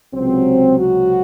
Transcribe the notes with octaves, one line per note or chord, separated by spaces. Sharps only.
C#2 C3 F#3 C4
F#4